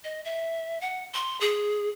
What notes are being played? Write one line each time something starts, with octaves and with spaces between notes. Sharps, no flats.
D#5
E5
F#5
C6
G#4